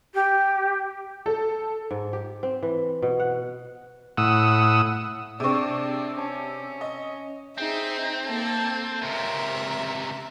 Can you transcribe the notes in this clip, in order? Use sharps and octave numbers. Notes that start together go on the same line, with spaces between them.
G4
A4
G#2
G4
C4
E3
B2
F#5
A2 F#5 D#6 E6
C3 C4 D4 G#4 C#6
C#4 A5
D#5
C4 D#4 G#4 E5
A#3 A4 A5
C#2 C3 A#4 E5